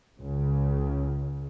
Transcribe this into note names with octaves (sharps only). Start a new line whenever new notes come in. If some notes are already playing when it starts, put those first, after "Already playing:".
C#2 C#3